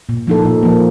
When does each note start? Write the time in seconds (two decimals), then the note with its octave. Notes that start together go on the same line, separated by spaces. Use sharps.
0.09 A#2
0.27 F3 A#3 D#4 A4
0.45 A#2
0.63 F3 A#3